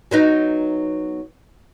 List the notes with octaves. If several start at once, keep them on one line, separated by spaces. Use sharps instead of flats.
F#3 B3 D#4